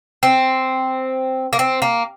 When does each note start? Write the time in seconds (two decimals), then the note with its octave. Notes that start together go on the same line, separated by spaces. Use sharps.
0.23 C4
1.53 A#3
1.59 C4
1.82 A#3